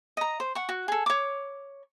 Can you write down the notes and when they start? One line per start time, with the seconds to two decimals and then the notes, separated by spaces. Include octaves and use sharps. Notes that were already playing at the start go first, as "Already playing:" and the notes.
0.17 D#5 A#5
0.40 C5
0.55 F#5 C#6
0.69 F#4
0.88 G#4 A4
1.06 C#5 D6